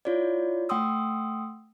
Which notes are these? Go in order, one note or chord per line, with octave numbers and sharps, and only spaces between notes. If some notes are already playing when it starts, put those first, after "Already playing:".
E4 F4 C#5 D5
A3 F#5 G5 C6 D#6 E6